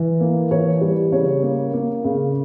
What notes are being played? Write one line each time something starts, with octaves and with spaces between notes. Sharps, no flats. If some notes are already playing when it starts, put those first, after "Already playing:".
Already playing: E3
A#3
E3 C#5
G3
C#3 C#5
A#3
A#3
C#3